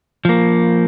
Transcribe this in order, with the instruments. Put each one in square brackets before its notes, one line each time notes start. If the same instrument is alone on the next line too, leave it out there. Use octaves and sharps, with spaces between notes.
[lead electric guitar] F3 A#3